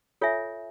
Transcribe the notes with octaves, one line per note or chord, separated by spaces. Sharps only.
F4 A4 C#5 E5 G#5